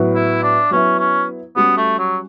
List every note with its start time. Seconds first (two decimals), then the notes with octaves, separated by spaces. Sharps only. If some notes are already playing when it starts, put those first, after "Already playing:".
Already playing: A2 F#3 B3 F#4
0.15 E4
0.43 D4
0.71 F#3 B3 C#4 E4
0.99 C#4
1.56 G3 B3 C#4 F#4
1.77 A3
1.99 F#3